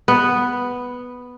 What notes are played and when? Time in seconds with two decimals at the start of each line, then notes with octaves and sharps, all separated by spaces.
0.08 B3